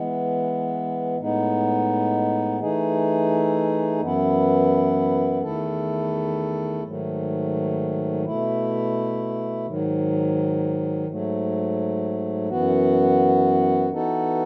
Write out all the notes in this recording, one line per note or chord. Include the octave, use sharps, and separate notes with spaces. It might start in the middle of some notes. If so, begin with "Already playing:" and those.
Already playing: E3 G#3 B3
A2 G#3 B3 D#4
E3 A3 D#4 G#4
F#2 E3 B3 E4
E2 D#3 A3 E4 A4
G#2 D#3 F#3 A3
B2 A3 E4
G#2 D#3 F#3
G#2 F#3 A3
F#2 E3 B3 F#4
E3 B3 D#4 F#4 A4